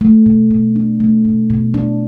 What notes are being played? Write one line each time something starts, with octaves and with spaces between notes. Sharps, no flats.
A3
B2
B2
D4
A3
B2
B2
D4